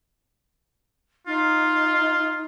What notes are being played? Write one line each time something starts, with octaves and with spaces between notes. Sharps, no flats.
D#4 F4